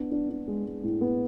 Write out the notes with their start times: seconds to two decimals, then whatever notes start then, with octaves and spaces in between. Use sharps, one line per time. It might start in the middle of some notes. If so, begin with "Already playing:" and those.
Already playing: B3 D4
0.11 D4
0.29 D4
0.48 G#3
0.65 G#3
0.83 A2
1.01 B3